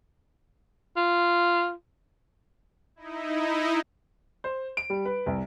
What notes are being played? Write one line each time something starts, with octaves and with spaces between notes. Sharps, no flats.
F4
D#4 E4
C5
D7
G3
B4
C2